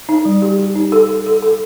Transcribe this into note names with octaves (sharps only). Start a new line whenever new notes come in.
D#4
G3
G4
G4
D#4
A4
A4
A4
A4